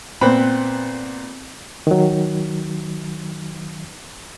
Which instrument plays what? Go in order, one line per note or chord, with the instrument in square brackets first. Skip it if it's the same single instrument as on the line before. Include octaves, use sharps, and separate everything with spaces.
[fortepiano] A#2 B3 C4 B4 B5
[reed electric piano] D#3 F#3